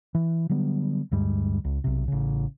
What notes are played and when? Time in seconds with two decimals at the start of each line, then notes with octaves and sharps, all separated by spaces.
0.15 E3
0.49 D3 F#3 G3 B3
1.12 D2 G2 G3 G#3
1.65 C#2
1.84 B1 C3
2.08 A1 C#3